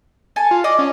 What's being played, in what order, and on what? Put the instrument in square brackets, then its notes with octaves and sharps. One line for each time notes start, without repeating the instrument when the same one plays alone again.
[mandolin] A4 G#5 A5
[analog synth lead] F4
[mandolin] D5 [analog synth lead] D#5
[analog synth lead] C#4